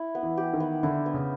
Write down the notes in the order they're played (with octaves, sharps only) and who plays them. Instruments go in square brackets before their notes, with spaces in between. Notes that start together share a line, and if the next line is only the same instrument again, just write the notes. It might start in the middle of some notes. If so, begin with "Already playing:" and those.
Already playing: [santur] E4
B3
[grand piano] E3
[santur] G4
[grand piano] D#3
[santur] B3
[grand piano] D3 [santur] E4
[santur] B3
[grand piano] C#3